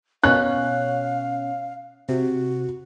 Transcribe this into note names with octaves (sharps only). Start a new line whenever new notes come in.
B2 C#4 F5 F#6
C3 F#4